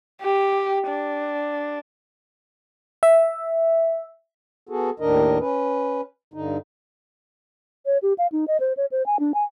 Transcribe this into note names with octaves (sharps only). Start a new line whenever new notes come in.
G4
D4
E5
B3 F#4 G#4 A4
D#2 A2 D#3 D4 A#4 D#5
C#4 B4
G2 D3 D#4
C#5
G4
F5
D#4
D#5
C5
C#5
C5
G#5
D4
G#5